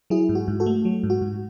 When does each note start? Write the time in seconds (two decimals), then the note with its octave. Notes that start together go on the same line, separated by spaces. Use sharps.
0.10 F#3 E4 G#4
0.29 G#2
0.35 F#4
0.48 G#2
0.60 F#4 A4
0.66 A3
0.85 F#3
1.03 G#2
1.10 F#4
1.21 G#2